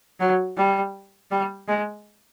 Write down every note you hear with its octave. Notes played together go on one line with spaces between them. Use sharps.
F#3
G3
G3
G#3